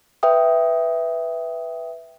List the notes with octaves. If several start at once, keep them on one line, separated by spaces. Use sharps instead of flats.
B4 E5 G5 D#6